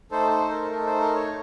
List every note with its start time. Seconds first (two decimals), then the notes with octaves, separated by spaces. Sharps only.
0.11 A3 D#4 A4 C5
0.31 C5
0.51 A#4
0.70 A3 D#4 A4 A#4
0.86 C5
1.00 A#4
1.15 C#5